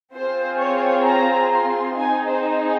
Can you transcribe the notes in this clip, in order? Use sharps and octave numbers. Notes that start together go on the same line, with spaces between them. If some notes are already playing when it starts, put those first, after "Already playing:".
C4 F4 G#4 C5
C#5
A#5
C6
C4 D#4 G#4 G#5
C5